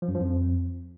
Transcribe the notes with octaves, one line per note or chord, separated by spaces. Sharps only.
F3
F#2
F3
F2